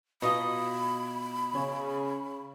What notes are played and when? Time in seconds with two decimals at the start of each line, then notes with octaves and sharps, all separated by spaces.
0.22 B2 D#4 F4 D#5 B5
1.55 C#3 C#4